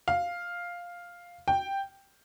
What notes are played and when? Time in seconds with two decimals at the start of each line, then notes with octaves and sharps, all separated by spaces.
0.08 F5
1.48 G5